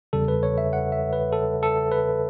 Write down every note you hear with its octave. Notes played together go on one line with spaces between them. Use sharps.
E2 C#3 G3 A4
B4
C#5
E5
F#5
E5
B4
A4
A4
B4